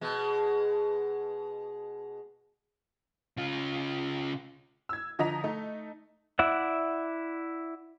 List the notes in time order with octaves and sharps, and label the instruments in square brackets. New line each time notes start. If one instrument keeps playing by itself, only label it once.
[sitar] B2 G#3
[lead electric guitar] C#3 F4
[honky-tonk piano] E6 G#6
D3 F3 D#5 A#5 B6 F7
A3 D#4
[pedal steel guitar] E4 D5 E5 F#5